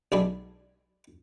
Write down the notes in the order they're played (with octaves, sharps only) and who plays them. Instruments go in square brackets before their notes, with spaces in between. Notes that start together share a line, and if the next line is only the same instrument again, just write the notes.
[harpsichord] B1 G#3 D4 G#5 B5